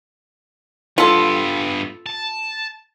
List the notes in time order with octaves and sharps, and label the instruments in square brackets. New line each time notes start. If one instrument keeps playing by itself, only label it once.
[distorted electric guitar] G2 B3 [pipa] F4 A4
[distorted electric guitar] A5